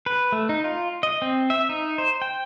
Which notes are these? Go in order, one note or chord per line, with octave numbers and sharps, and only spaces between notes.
B4
A3
D#4
F4
D#5
C4
E5
D#4
C5
G5